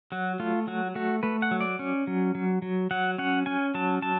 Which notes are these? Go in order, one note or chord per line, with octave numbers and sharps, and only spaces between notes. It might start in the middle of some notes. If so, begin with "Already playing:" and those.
F#3 F#4
A3 F4
F#3 F#4
A3 F#4
A3 B4
F#5
F#3
D5
C#4
F#3
F#3
F#3
F#3 F#5
C#4 F#5
C#4 G#5
F#3 A5
F#3 A5